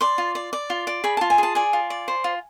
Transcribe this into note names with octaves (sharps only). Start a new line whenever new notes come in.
D5 C6
F4
D5
D5
F4
D5
G#4 B5
F4 A5
G#5
G#4 A5
D5 G#5
F4
D5
C5
F4